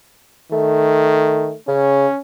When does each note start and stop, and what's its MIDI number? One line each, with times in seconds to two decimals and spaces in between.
0.52 1.53 51
0.52 1.55 57
1.68 2.07 49
1.68 2.19 61